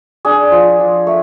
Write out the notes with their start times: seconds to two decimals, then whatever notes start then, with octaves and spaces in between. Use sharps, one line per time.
0.25 D4 G#4
0.52 F3
0.80 F3
1.07 A3